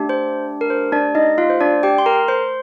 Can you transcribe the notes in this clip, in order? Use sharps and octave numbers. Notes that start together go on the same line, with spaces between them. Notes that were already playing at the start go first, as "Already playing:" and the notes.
Already playing: A3 D4 G4
C5
A#4
C5
D4 D5
D#4 D#5
F4 F5
C5
D4 D5
G4 G5
C6
A#4 A#5
C5 C6